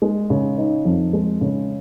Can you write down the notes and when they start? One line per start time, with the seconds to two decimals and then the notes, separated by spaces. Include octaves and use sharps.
0.02 G#3
0.30 C#3
0.58 D#4
0.85 F2
1.13 G#3
1.41 C#3